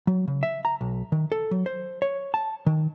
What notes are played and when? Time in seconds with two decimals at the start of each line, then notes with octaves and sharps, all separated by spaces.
0.07 F#3
0.28 C#3
0.43 E5
0.65 A#5
0.81 B1
1.12 D#3
1.32 A4
1.51 F#3
1.66 C5
2.02 C#5
2.34 A5
2.67 D#3